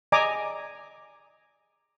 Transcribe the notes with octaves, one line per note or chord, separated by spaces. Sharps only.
D5 D#5 G#5 A#5 D6